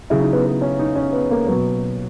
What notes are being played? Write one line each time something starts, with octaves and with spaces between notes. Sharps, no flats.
C#3 F#3 E4
D#4
B3
B3
C#4
D#4
C#4
B3
A#3
B2 F#3 B3